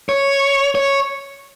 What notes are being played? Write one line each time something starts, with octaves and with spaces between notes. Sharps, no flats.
C#5
C#5